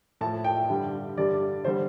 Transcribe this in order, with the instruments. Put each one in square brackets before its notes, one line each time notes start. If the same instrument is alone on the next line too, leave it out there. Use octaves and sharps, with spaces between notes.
[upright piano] A2 F3 A5
G5
G2 D3 G3
G2 D3 G3 D5
D3 G3 C5